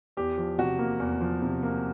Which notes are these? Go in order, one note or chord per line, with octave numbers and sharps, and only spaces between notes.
E2 G4
F3
C3 F#4
A#3
E2
F3
C3
A#3